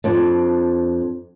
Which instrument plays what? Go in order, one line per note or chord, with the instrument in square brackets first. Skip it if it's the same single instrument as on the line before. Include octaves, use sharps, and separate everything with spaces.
[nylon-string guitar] F2 C4 D4